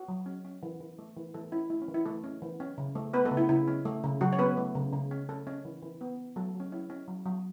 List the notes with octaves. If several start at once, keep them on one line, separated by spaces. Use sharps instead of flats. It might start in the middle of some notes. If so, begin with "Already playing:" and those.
Already playing: F#4
F#3
C#4
C#4
E3
E3
A3
E3
E3 A3 A4
C#4 E4
A3 E4
C#4
E3
E4
E3 A3 A4
C#4
E3
C#4
C#3
A3
A3 B3 B4
A3 A4
C#3
E4
C#3 E4
C#4
A3
C#3
C#3 F#3 F#4
C#5
B3 C#4 B4
A3
C#3
C#3
C#4
A3 C#4 A4
C#4
E3
E3
B3
B3
F#3 A3 A4
F#3
C#4
C#4 E4
C#4
F#3
F#3